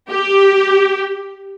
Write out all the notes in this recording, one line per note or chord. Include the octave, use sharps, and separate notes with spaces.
G4